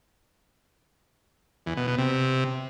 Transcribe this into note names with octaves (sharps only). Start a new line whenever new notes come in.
E2
B2
B2
C3